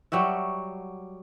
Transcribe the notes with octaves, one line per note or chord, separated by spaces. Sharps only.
F#3 G3 F#4 E5